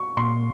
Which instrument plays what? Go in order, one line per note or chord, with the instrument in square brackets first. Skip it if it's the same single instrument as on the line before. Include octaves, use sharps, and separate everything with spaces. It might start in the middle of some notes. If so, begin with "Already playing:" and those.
Already playing: [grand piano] C#6
[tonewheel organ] A#2 [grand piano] C6